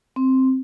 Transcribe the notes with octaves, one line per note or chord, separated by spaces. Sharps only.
C4